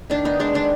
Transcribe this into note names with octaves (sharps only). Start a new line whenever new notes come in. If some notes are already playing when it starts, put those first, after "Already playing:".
D#3 D4
B3 D#4
G#3 D4
D#3 D4